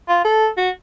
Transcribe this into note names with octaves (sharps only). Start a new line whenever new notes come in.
F4
A4
F#4